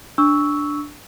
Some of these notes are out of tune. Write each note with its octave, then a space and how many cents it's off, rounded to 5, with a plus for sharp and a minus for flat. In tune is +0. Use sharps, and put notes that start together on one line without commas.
D4 +0 C#6 +10 E6 -10